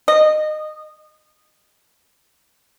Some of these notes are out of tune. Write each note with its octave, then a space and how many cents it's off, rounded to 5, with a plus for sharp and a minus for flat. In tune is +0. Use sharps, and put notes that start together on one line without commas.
D#5 -20